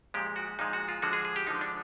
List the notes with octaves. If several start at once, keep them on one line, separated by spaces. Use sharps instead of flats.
A#2 F3 G#3 G4
F#4
A#2 F3 G#3 D#4
F#4
F4
D3 F3 G#3 F#4
G#4
G#4
G4
D3 F3 G#3 D#4
D4